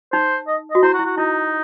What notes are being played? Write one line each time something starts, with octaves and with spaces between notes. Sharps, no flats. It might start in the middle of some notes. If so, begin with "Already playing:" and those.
D#4 C5
D#5
D#5
F#4
E4 C5
F#4
E4
F#4
D#4 E4